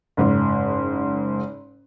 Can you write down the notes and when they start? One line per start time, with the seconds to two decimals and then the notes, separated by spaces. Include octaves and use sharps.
0.17 F#1 G#2